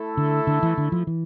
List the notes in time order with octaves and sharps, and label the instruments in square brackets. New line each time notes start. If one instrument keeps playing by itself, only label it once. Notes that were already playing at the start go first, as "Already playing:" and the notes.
Already playing: [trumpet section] A3 E4 A4
[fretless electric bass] D3
D3
E3
D3
F3
E3